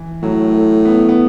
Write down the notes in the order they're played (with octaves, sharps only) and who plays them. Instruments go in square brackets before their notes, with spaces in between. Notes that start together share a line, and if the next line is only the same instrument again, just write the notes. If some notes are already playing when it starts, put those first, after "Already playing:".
Already playing: [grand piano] E3
[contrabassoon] A2 [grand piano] F#3
[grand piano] A3
B3
B3